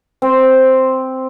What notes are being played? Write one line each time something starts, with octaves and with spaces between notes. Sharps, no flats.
C4